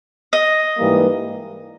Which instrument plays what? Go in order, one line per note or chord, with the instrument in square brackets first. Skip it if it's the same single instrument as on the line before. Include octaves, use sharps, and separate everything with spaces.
[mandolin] D#5
[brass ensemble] G#2 E3 G3 A#3